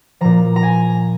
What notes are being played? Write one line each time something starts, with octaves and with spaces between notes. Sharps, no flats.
A#2 F3 A#5
A#5
G#5